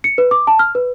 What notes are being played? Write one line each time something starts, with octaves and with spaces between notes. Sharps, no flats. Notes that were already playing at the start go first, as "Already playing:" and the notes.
C#7
B4
D6
A5
F6
B4